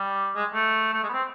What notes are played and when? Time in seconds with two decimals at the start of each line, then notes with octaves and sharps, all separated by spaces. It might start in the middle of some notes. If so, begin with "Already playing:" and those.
Already playing: G3
0.35 G#3
0.54 A3
0.94 A3
1.03 G#3
1.09 B3
1.13 C4